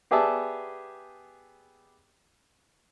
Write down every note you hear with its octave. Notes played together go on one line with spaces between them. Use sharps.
B3 G4 G#4 D5 E5 A5